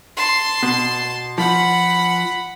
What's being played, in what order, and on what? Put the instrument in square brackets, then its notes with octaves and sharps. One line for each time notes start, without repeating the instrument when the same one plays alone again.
[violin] A5 C6
[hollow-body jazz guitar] B2
[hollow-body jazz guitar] F3 [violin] F#5 B5